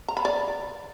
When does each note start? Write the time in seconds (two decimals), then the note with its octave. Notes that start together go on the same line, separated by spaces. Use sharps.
0.08 A#5
0.17 B5
0.25 D5